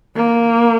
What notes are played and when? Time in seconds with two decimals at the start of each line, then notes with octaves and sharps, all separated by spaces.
0.16 A#3